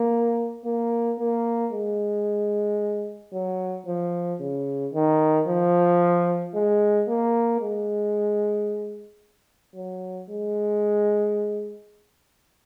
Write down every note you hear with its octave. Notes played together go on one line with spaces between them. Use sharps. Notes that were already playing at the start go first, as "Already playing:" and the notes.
Already playing: A#3
A#3
A#3
G#3
F#3
F3
C#3
D#3
F3
G#3
A#3
G#3
F#3
G#3